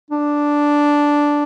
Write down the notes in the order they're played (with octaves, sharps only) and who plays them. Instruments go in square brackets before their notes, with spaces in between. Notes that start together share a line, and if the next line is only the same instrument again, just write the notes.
[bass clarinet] D4